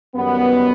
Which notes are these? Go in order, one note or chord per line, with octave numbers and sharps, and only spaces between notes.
F#2 D#3 G3 B3